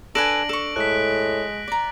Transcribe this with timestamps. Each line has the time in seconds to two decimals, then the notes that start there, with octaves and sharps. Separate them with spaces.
0.15 D4 A4 B4 G#5 A#6 D7 F#7
0.49 A4 C#6
0.76 A2 G#3 F#6 B6
1.68 D5 A#5